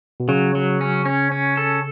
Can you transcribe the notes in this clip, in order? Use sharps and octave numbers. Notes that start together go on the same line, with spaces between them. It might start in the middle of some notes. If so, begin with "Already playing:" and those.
B2
C#3 F#3
F#3
C#4
C#4
C#4
A4